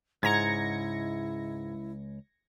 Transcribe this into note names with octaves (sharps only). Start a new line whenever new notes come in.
C#2 G#2 E4 A#5 G#6 A#6 C#7